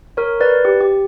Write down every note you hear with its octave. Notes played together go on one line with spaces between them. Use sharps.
A#4 C#5
B4 D5
G4
G4